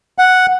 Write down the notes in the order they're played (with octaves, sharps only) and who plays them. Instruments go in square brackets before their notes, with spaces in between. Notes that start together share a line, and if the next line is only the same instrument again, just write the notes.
[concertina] F#5